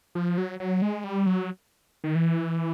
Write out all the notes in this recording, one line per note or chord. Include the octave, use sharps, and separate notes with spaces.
F3
F#3
F#3
G#3
G3
F#3
D#3
E3